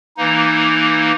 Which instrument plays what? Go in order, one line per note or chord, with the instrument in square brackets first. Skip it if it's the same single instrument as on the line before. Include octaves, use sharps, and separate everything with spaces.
[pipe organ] E3 A#3 D#4